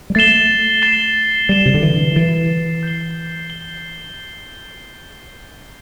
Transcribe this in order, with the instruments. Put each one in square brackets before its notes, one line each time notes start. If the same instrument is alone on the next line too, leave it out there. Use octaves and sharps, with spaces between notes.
[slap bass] G3
[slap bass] A3 [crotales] A6 C7 E7 G7
[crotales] A6 C7 E7 G7
[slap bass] G3 [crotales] A6 C7 E7 G7
[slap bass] C3
D3
E3
[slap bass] E3 [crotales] A6 C7 E7 G7
[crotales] G6 C7 G7
G7